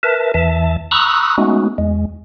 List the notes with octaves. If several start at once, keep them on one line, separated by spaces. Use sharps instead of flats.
A#4 B4 E5 A5
E2 E3 E5 A5
A#5 B5 C#6 D#6 E6 F#6
G#3 A3 B3 C#4 D#4 F#4
E2 G#3